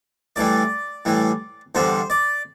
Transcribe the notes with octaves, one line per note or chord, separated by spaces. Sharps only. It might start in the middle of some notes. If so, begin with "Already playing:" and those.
A2 E3 G3 D5
A2 E3 G3
E2 D3 G3 C5
D5